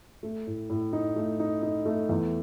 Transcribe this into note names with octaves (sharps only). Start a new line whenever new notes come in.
A3
A2
A2
D#4
A3
D#4
D#4
A3
E2